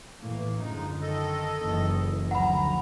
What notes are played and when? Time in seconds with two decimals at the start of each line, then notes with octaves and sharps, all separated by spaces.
0.20 A2 E3 A#3
0.59 F#2 D3 F3 G#3 D#4
1.02 D#3 A4 D#5
1.62 F#1 E3
2.31 D2 F3 F#3 F#5 A#5 B5